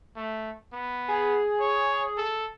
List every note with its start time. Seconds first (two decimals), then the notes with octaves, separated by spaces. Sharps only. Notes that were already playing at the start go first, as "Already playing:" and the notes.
0.17 A3
0.73 B3
1.08 G#4
1.60 C#5
2.18 A4